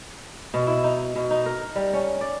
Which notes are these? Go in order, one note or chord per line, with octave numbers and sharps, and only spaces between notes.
B2
E4
D#4
B2
D#4
A#4
G3
C#4
D5